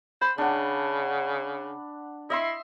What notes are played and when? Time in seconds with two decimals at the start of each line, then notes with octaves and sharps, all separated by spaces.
0.21 C5 B5
0.38 C#3 D4 F#5
2.30 E4 D#5 E5 C6